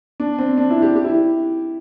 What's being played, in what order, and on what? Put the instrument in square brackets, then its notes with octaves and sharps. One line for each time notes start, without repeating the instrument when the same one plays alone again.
[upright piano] D4
C4
D4
E4
G4
G4
E4